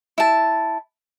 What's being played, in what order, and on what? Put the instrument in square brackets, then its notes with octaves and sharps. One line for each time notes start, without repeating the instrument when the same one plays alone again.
[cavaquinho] E4 A5